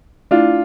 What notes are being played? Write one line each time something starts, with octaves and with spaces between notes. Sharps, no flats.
A3 D4 E4 F4